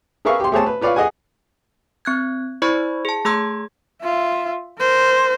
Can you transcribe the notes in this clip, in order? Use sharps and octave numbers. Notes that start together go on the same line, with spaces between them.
G#4 A#4 B4 E5 F5 C#6
G4 C6
A3 G4 G#4 C5 C#5 A5
B4
F4 B4 C#5 D5 F5
G#4 D#5 F#5 G#5
C4 F#6 G#6
E4 C5 D5 B5 C#6 G#6
G#4 A5
A3 G#4 A#5 C6 E6 G#6
F4 E5
A#4 C5